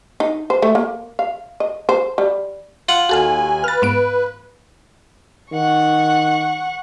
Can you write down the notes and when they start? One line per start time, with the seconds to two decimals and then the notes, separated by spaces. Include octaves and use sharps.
0.20 D#4
0.50 C5
0.62 A3
0.75 A#3
1.19 F5
1.60 D#5
1.89 C5
2.18 G3
2.89 F4 F#5
3.09 D#2 F#4 A4 F5 G#5
3.64 B4 F6 A6
3.82 G#2 B3 D7
5.53 D#3 F#5 C#6